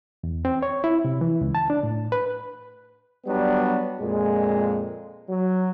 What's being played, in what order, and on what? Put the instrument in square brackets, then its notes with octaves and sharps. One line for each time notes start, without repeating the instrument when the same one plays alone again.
[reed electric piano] E2
C4
C#5
E4
C3
E3
C#2
A5
D4
A2
B4
[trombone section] F#3 G3 B3 D4
F2 A#2 G#3
F#3